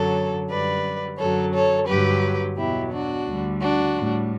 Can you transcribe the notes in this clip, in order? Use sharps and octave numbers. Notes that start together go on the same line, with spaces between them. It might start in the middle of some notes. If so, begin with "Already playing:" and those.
Already playing: F#2 D3 F#3 A4 C#5
F#2 D3 G3 B4 D5
F#2 D3 F#3 A4 C#5
A4 C#5
G2 D3 F#3 G4 B4
E2 B2 F#3 E4 G4
D4 F#4
D2 D3 G3
D4 F#4
A2 G3